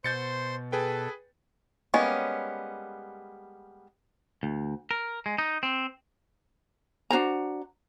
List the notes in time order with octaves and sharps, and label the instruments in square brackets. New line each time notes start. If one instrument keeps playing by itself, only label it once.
[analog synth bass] B2 [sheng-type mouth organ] C5 C6 [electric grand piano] G6 A6 C#7
[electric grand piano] G#4 B4 G5 [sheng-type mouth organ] A4
[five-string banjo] G3 G#3 A#3 B3 C#4
[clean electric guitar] D2
A#4
G#3
D#4
C4
[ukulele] D4 F#4 C5 A#5